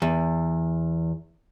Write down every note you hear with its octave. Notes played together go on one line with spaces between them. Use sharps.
E2